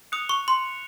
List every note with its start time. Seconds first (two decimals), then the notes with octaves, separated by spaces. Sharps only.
0.12 D#6 F#6 C#7 F7
0.29 C#6
0.48 C6